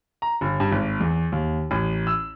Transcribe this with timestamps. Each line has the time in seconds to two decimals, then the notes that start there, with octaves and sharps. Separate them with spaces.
0.22 A#5
0.41 G1
0.60 G2
0.72 G#1
1.00 E2
1.32 D#2
1.71 A1
2.07 E6